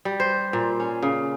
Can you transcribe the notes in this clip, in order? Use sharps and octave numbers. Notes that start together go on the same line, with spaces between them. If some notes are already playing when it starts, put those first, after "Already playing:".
G3
C5
A#2
C#4
C#3